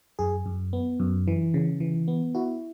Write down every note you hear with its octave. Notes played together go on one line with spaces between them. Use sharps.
F#2 G#4
F#2
B3
F#2
E3
C#3
E3
B3
E4 F#4